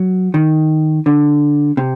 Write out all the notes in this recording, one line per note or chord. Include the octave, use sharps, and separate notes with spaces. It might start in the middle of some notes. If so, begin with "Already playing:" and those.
Already playing: F#3
D#3
D3
C3